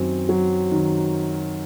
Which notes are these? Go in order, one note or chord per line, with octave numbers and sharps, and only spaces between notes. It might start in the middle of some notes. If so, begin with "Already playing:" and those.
Already playing: F#2 D#3 C4
F#3
D#3